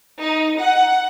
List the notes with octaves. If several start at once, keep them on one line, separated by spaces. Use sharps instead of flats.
D#4
F#5